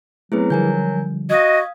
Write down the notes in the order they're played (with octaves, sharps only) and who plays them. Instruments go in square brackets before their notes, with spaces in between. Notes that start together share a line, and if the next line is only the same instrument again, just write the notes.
[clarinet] F#3 [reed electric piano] A3 B3 C4 [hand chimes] E4 G#4 B4
[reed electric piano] D3 F3 G3 [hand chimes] A#4 G#5 G6
[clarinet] F#4 [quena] D#5 [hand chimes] F5 D#6 G#6